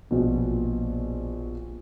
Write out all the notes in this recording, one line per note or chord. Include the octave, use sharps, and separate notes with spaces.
A#1 B2